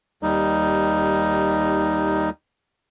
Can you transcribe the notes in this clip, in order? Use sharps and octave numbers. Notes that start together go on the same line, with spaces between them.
D#2 G3 D#4